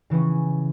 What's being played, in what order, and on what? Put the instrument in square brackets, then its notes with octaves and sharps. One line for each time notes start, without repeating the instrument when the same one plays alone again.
[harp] C#3 E3 C#4